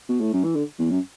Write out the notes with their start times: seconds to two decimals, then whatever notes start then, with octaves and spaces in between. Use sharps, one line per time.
0.09 B2
0.20 A2
0.33 F#2
0.44 E3
0.55 D3
0.79 E2
0.90 F#2